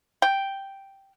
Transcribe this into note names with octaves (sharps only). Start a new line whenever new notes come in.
G5